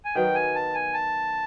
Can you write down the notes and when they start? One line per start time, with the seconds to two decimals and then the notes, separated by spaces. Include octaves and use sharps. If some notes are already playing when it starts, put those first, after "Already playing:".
0.05 G#5
0.15 D#3 F#3 B3 G5
0.35 G#5
0.55 A5
0.75 G#5
0.94 A5